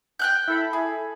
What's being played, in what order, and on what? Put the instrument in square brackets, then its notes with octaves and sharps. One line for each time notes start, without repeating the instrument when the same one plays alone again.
[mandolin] G5 F#6 G6
[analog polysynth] E4 A4 B5
[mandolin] G#4